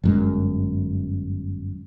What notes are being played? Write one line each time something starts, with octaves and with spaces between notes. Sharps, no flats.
G1 F#2 G#3